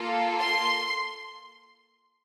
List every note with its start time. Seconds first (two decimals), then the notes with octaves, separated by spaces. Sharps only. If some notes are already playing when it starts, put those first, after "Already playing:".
Already playing: A#3 F4 A4
0.38 C6